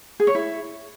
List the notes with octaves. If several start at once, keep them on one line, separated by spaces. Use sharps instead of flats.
G#4
C#5
E4